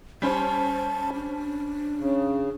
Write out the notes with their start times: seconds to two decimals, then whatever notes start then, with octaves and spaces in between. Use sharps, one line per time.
0.22 G3 C#4 C5 A5
1.14 D4
1.98 C#3